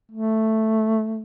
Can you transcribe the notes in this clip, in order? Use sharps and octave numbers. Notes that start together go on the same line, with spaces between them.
A3